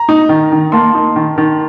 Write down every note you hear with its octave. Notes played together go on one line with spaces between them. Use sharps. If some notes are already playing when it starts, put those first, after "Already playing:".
Already playing: A#5
D#4
D#3
D#3
A#3 A5 C6
D#4
D#3
D#3